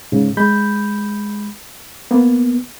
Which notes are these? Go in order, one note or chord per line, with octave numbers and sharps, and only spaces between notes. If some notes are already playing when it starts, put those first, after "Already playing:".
G#2 C#3
G#3 B5 G6
A#3 B3